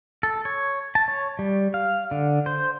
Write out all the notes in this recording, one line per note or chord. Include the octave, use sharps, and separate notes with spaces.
A4
C#5
A5
C#5
G3
F5
D3
C5